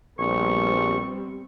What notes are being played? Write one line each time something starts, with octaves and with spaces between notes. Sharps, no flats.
A#1 G3 B3 C4 C#6